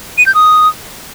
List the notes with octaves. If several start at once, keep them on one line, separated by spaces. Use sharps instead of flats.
D#7
G6
D#6